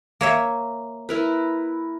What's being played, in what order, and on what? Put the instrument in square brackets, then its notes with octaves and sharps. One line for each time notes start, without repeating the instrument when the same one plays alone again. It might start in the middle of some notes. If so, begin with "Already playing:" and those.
[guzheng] A#3 C#5 E5
[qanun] E4 A#4 B4